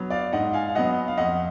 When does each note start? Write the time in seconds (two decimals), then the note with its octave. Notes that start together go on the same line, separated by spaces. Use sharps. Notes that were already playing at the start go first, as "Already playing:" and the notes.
Already playing: F#3 B3
0.10 D5 F5
0.33 G#2 D#5 F#5
0.53 F5 G#5
0.68 F5
0.75 F#3 B3 D#5 F#5
1.08 F5
1.17 F2 D#5 F#5